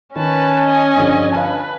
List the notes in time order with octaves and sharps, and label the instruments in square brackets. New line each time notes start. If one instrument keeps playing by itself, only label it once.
[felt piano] D#3 [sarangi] C#4 [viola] B4 A5
[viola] D#5 G#5
[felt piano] G2 D3 F3
[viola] B4 [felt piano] F5 G#5 A5